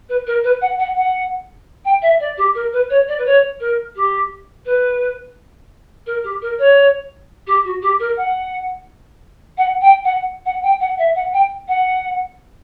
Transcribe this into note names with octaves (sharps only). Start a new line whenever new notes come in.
B4
A#4
B4
F#5
F#5
F#5
G5
E5
D5
G4
A#4
B4
C#5
D5
B4
C#5
A#4
G4
B4
A#4
G4
A#4
C#5
G4
F#4
G4
A#4
F#5
F#5
G5
F#5
F#5
G5
F#5
E5
F#5
G5
F#5